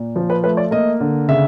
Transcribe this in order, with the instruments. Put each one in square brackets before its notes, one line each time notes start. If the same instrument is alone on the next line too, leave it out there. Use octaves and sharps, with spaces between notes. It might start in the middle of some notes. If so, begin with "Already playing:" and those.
Already playing: [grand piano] A#2
F3
B4
A3 B4
D5
A#3 D#5
D3
C#3 E5